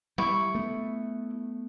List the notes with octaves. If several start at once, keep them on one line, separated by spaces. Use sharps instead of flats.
G3 E4 C#6
A3 B3